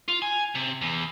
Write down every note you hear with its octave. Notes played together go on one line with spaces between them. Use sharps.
F4
G#5
C3
E2